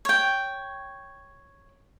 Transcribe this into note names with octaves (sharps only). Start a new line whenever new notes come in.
C#5 G5